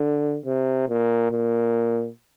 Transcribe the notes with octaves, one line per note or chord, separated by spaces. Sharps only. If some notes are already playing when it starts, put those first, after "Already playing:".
Already playing: D3
C3
A#2
A#2